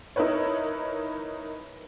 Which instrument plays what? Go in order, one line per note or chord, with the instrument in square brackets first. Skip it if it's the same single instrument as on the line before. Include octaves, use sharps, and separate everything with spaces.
[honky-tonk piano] D#4 E4 A#4 B4 C#5